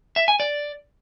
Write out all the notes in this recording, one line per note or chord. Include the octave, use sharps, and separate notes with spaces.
E5
G#5
D5